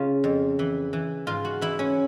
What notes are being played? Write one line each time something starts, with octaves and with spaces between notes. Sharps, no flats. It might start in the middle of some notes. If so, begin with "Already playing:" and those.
Already playing: C#3 F4
F2
E3
E3
G#2 F4
F#4
E3 E4
C#4